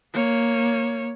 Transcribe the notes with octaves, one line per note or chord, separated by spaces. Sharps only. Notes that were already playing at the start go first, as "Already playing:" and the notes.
A#3 C#5